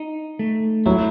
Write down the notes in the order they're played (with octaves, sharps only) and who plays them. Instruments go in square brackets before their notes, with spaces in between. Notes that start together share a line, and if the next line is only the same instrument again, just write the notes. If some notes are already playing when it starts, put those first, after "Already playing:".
Already playing: [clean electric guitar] D#4
A3
[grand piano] F#3 [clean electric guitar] E4